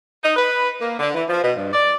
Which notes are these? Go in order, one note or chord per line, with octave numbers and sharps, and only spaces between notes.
D#4
B4
A#3
D3
E3
F3
B2
G2
D5